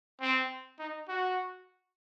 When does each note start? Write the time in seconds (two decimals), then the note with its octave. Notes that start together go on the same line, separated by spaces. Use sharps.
0.21 C4
0.79 D#4
1.08 F#4